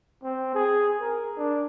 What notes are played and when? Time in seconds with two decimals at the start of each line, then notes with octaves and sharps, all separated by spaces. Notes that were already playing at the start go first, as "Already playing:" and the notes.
0.23 C4
0.54 G#4
1.01 A#4
1.37 D4